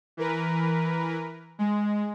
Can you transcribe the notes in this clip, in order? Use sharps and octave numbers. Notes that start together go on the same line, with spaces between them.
E3 A#4 B4
G#3